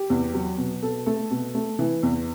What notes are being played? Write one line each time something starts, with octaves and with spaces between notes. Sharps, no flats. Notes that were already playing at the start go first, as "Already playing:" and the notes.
Already playing: G4
E2
F#3
B2
B2 A4
A3 A4
B2
A3
E3
E2